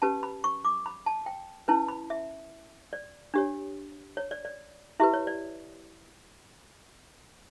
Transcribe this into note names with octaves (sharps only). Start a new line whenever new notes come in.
C#4 G4 B4 A5
B5
C#6
D6
B5
A5
G5
C#4 E4 B4 A5
B5
E5
D5
D4 G4 C#5
C#5
D5
D5
E4 G4 B4 E5
C#5
D5